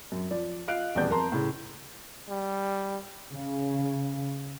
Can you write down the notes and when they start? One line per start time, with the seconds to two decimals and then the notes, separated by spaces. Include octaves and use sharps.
0.12 F#2
0.31 F3 D5
0.67 F4 D#5 F5 F#6 D7
0.95 D#1 E2 G4 G#4 D5 G6
1.10 F2 A#4 A5 A#5 C6
1.32 A2 C#3
2.29 G3
3.31 C#3